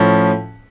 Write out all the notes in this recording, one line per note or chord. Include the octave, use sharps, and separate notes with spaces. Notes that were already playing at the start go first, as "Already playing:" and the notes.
Already playing: A2 F3 C#4